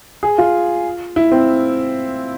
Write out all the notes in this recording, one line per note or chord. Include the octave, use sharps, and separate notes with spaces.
G#4
F4
E4
C4